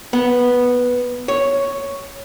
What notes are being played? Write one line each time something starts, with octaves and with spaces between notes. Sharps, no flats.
B3
C#5